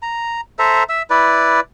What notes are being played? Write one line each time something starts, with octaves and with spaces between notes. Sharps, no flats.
A#5
A4 C5 E5 A#5
E5 E6
E4 B4 D5